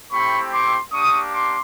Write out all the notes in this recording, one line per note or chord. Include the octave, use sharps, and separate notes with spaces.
A3 C4 E4 G4 B5 C#6
C6 D6
A#3 D4 G4 C#6 D#6
C6 D6